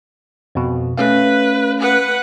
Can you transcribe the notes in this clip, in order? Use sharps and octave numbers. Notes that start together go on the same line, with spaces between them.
F2 B2
A3 C#4 B4 F5
B4 F#5